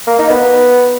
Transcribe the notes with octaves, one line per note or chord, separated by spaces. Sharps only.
A#3
D#4
B3